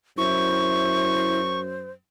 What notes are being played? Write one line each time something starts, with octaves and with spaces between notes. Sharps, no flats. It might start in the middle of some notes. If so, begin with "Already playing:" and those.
F#2 E4 C5 C#6